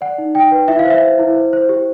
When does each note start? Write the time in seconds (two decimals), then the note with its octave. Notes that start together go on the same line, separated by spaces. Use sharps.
0.01 D5 F#5
0.18 D#4
0.35 D#4 G5
0.52 B4
0.68 E4 E5
0.79 F5
0.85 C5
0.90 E5
1.02 C5
1.19 E4
1.36 C5
1.53 C5
1.69 G4